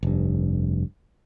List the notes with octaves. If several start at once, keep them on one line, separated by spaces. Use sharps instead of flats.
F1 G2